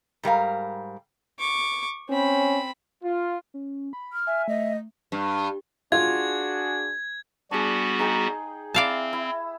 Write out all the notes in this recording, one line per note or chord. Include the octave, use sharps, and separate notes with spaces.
G#2 G3 A#4 F5
C#6 D6
C4 C#4 B5
F4
C#4
B5
F6
E5 G#5
A3 D#5
G2
D4 F4 F#4 G#4 G#6
G3 B3 D4 F#4 G#4
D#4 G#4 G5
C4 E4 D5 F5 A5
E4